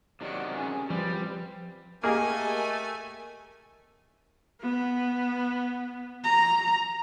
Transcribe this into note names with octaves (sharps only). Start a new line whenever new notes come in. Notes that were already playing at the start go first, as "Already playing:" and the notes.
C3 D#3 F#3 D5 F#5
C#4 G#4
F3 G3 C4 B4
A3 A#3 G4 G#4 A#4 D#5 G#5
B3
A#5